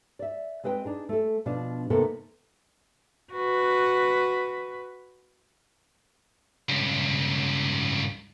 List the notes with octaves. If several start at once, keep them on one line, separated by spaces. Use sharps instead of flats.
D5 E5
G#3 C4 B4 D#5 G5
D4 D#4 G#4
A3 A4
B2 F3 D4 F4
C3 D#3 A#3 B3 A4 A#4
F#4 B4
C#2 G2